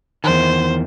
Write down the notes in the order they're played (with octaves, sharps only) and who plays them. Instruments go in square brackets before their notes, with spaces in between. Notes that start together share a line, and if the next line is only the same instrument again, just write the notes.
[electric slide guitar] E2 D#3 [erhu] C5